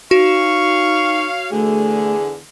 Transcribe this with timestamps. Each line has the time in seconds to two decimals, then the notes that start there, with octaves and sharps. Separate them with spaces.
0.11 D#4 F#4 C#5 F5 C#6
1.51 E2 D3 A3 G#4